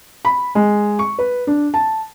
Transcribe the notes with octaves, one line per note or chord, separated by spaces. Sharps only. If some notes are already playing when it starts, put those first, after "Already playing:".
B5
G#3
C#6
B4
D4
A5